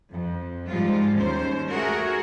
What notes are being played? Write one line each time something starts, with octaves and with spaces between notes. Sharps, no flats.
F2
G#2 F3 G3 G#3 F4
D#2 C#4 C5
A3 F#4 G#4 A#4